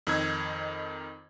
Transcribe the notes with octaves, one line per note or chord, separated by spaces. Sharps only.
F2 D#3 D#4 E6 G#6